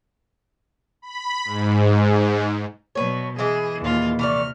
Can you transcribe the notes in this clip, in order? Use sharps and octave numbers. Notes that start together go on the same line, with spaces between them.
B5
G#2
B2 F#3 B4 C#5
E3 G#3 E4 G#4
D#2 A#2 F4
C3 E3 A3 D5 F6